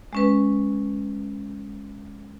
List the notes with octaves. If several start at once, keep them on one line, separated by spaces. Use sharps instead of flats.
G#3 C#4 B4